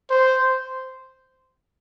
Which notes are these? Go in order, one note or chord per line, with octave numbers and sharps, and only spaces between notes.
C5